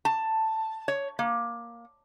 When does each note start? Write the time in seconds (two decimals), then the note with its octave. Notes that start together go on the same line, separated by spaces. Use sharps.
0.05 A5
0.88 C#5
1.19 A#3